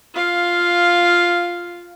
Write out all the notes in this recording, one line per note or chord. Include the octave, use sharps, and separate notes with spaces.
F4 F5